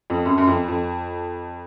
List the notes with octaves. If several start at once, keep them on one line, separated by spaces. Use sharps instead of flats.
F2
F#2
F#2
F2
F2